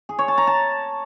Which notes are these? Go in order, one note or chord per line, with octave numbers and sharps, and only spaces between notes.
G#4
C#5
A5
A#5
A5